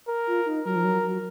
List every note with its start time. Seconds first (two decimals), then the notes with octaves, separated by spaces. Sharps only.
0.08 A#4
0.27 F4
0.46 D#4
0.65 F#3 A#4
0.76 F3
0.85 F#3
1.04 F#3